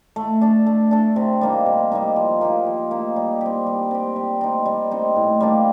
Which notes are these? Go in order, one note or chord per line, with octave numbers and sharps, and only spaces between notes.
A3
D4 A4
A3
D4 A4
C3
G3 A#3 D#4
C3
G3 A#3 D#4
F3
A#3 D#4 G4
F3
A#3 D#4 G4
G3
C4 G4
G3
C4 G4
G3
C4 D#4
G3
C4 D#4
A2
G3 A#3 D4